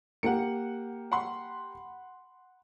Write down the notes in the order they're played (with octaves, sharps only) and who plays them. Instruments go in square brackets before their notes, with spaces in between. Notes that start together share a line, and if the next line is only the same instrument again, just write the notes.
[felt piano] A#3 G4 [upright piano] F#5 C#7
[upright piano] F#5 B5 C6